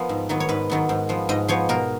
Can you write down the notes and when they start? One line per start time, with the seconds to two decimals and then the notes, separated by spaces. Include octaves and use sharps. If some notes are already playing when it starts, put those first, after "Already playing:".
Already playing: F3 B3 A#4
0.09 G#2
0.29 D#3 F#3 B3
0.40 C#5
0.49 G#2 B4
0.70 D#3 F#3 B3
0.89 G#2
1.09 F3 B3
1.29 G#2 D#5
1.48 F3 B3 C#5
1.69 B2 A#4